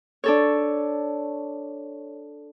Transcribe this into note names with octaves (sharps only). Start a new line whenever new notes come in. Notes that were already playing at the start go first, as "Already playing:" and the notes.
D4 A4 C#5